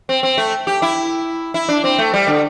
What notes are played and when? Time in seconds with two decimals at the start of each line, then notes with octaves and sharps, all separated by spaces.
0.09 C4
0.23 C4
0.38 A3
0.67 G4
0.82 E4
1.54 E4
1.69 D4
1.84 C4
1.98 A3
2.14 G3
2.27 D3